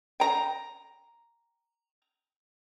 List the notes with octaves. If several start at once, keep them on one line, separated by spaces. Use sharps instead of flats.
G5 A#5